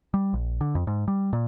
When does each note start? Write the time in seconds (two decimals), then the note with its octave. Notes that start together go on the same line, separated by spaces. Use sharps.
0.14 G3
0.33 A#1
0.61 D3
0.75 F2
0.87 G#2
1.08 G3
1.33 A#2